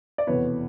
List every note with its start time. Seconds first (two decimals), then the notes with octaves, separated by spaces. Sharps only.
0.18 D5
0.27 F1 E2 B2 B4 C#5